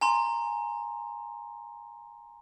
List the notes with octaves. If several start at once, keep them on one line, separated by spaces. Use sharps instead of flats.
G#5 A#5 C6